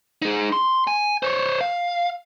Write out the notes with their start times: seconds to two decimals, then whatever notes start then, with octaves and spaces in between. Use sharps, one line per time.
0.22 D#4 G#4
0.52 C6
0.87 G#5
1.23 C5 C#5
1.61 F5